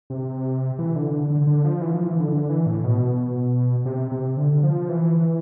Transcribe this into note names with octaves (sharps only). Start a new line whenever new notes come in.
C3
E3
D3
D3
D3
D3
F3
E3
F3
E3
D3
D3
E3
A2
B2
C3
C3
D3
F3
E3